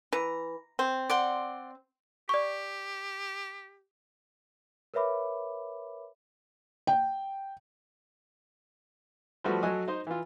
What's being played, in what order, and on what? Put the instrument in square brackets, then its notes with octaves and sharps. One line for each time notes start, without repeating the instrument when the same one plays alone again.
[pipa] E3 [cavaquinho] A#5
[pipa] C4
[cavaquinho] D5 F#5 C6
[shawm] G4 [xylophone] D5 C#6
[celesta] A#4 B4 C#5 E5 B5 D6
[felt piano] G5
[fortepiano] F3 G3 A3 F#4 B4
F#3 F#4 A4 D#5 G#5
D#4 C5 D#5
E3 F4